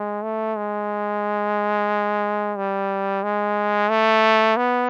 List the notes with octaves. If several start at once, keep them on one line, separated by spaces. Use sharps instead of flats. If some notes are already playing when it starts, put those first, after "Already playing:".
Already playing: G#3
A3
G#3
G3
G#3
A3
B3